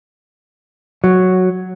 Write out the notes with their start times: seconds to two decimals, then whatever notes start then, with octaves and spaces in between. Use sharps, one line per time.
1.04 F#3